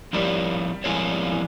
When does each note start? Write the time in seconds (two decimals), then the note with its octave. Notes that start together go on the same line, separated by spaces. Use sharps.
0.13 F3 G3 C4 E4 A#4 C#5
0.84 F3 G#3 C4 E4 A#4 C#5
1.09 G3
1.32 E3